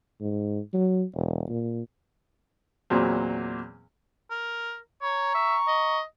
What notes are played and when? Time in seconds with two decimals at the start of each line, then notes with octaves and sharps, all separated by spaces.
0.21 G#2
0.73 F#3
1.14 E1
1.49 A#2
2.90 E2 A#2 F#3 C4
4.31 A#4
5.02 C#5 A#5 C#6
5.35 E5
5.68 D#5